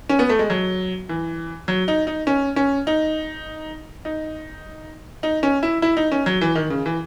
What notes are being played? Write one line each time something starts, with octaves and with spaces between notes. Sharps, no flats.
C#4
B3
A3
G#3
F#3
E3
F#3
D#4
D#4
C#4
C#4
D#4
D#4
D#4
C#4
E4
E4
D#4
C#4
F#3
E3
D#3
C#3
E3